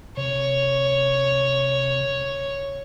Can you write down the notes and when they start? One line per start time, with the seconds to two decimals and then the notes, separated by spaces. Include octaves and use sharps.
0.17 C3 C#5